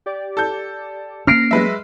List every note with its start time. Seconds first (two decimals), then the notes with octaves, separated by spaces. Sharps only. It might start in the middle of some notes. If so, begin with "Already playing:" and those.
0.06 G4 D5
0.37 A4 G6
1.27 A#3 C#4 F6 A#6 C7 D7
1.51 F#3 G#3 B4 E5 A#6